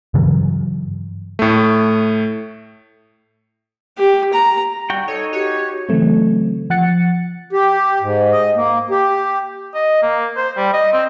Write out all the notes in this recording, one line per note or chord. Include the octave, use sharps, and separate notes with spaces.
G2 C#3 E3 F#3
A2 A3
G4
A#5
G3 F#4 G5
D#4 A4 C#5
F#4 G4 C#5
C#3 E3 F#3 A3 C4
F3 F#5 F#6 A6 C#7
G4
G#2
D#5
A#3
G4
D#5
A#3
C5
G3
D#5
C4